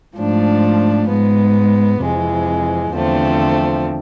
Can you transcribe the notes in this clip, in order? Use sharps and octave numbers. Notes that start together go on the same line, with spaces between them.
G#2 F3 A3 D4
G#2 G#3 B3
F2 C3 E3 G#3
E2 D3 F3 A3 C4